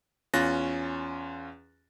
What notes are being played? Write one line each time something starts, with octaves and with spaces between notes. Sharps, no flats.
E2 C#4 F4 F#6 A6 A#6